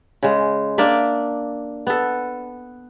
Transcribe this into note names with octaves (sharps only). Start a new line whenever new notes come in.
C#3 G#3
A#3 D4 D5 E5
B3 A4